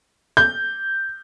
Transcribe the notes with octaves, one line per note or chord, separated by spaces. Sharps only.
G6